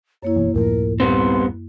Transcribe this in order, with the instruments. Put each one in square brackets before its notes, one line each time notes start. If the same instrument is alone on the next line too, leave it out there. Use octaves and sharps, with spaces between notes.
[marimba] F#2 A#3 E4 [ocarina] C#5
[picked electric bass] E1 E2
[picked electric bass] D1 A2 F3 [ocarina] A#4
[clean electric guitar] G3 B3 C4 [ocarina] C6